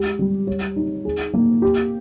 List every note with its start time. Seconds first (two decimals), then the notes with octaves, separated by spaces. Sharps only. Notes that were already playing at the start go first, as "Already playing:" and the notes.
Already playing: G#3 G4
0.19 G3
0.47 C#5
0.76 D#4
1.05 G#4
1.34 A#3
1.62 G4